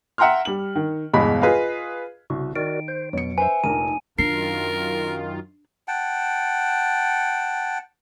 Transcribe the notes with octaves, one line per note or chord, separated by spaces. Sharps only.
E5 F#5 G5 A#5 C6 F6
G3 F#7
D#3
G1 E2 B2 G#3 B5
F4 G#4 B4 D#5 F5
C2 C#3 F#4
D#3 F#4 A#4 D5 D7
C5
F2 B2 F#3 C#7
B4 C5 E5 G#5
F1 A#1 D#4 A#4 D#7
F#2 D#3 D4 F4 A#4 C7
F#5 G5 A5